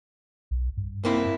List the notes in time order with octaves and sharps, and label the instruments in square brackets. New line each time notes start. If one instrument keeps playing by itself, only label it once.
[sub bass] B1
G2
[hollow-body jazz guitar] A#3 C4 E4